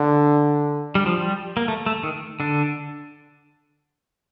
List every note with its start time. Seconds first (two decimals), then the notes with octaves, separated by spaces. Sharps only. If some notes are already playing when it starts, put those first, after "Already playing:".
Already playing: D3
0.95 G3
1.06 F3
1.17 G3
1.57 A#3
1.68 A3
1.86 A3
2.03 D#3
2.40 D3 D4